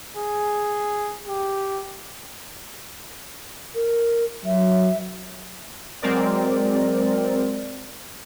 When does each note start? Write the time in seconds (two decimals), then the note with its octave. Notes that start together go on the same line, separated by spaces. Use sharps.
0.17 G#4
1.28 G4
3.74 A#4
4.45 F#3 E5
6.02 F#3 G#3 C4 A#4 D5